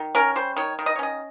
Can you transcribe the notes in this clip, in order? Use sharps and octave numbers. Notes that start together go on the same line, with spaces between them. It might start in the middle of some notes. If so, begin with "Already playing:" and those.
Already playing: D#3
C#4 A#4
G3 C5
D#3 C#5
D#3
D#5
C#5
C#4 D#5